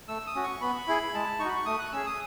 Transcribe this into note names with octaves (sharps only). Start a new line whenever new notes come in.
A3 E6
D#6
C#4 F#4
C#6
B3 B5
E4 G#4
G#3 A5
D#4 C#6
F#4 B5
C#6
A3 D#6
F#6
C#4 G#4 E6
D#6